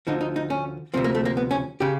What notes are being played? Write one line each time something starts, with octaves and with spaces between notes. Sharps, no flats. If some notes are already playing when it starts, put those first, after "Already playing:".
D2 D3 F3 D#4
D#4
D#4
C#4
D2 C3 F3 C4
A#3
A3
A#3
B3
C#4
C#3 G4